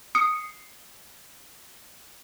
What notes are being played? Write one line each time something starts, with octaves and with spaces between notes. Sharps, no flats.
D#6 C7 C#7